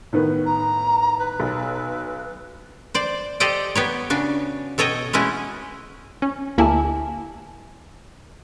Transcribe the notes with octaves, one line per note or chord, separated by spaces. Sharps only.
A2 D#3 B3
A#5
B4
B1
C5 D5
G4 A4 C5 D5 D#5 G5
B3 G4 C#5
C#3 D4 F#4
B2 A4 C#5 D#5 G5
G#3 A3 C#4 E4 F#4
C#4
D2 A#3 E4 G4 G#5 A5